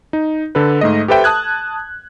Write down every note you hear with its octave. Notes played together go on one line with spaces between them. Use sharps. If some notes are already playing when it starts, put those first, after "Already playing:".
D#4
D3 A4 B4
G#2 A3 D#5
G4 A4 B4 C5 E5 G5
A5 D#6 F#6 G#6